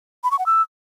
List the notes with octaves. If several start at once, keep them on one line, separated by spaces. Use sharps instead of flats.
B5
C#6
F#5
E6